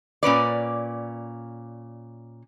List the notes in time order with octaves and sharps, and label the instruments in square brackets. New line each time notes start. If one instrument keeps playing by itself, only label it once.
[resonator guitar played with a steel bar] A#2 C#4 B4 D5